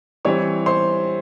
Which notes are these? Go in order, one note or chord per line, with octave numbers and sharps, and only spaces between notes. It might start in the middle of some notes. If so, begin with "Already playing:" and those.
E3 G3 C4 C#5 C#6
C5 C6